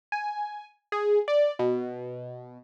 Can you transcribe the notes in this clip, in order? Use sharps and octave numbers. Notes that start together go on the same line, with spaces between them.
G#5
G#4
D5
B2